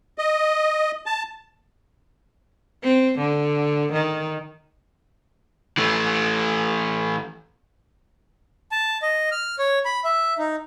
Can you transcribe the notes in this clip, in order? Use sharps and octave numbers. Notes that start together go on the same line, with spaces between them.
D#5
A5
C4
D3
D#3
E3 A3
A5
D#5
F6
C#5
B5
E5
D#4